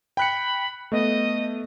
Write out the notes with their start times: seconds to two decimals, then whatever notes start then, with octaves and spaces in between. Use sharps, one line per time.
0.17 G5 B5 F#6 C#7
0.92 A3 B3 D#5